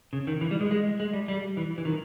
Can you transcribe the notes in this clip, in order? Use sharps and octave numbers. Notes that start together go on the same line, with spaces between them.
C#3
D#3
E3
G3
G#3
G#3
G#3
G3
G3
E3
E3
D#3